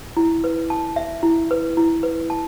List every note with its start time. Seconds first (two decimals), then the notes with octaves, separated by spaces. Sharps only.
0.17 E4
0.44 B4
0.70 A5
0.96 E5
1.23 E4
1.51 B4
1.77 E4
2.03 B4
2.30 A5